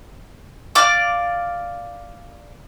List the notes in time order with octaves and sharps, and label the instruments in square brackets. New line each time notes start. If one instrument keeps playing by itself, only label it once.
[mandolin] D5 F5 D6